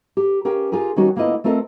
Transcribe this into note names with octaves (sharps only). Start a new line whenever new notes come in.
G4
C#4 G4 A#4 F5 G5
F4 G4 G#4 A#4
D#3 G3 C#4 D#4 F#4 C#5
D2 A#3 B3 E4 F4 D#5
A3 C4 F4 A#4 D5 D#5